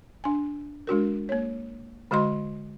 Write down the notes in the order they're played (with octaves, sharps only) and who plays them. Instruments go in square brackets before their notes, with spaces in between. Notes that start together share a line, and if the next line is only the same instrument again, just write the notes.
[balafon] D4 G#5
G#3 D4 F#4 A#4
A#3 C#5
D3 G#3 F#4 D#5 C6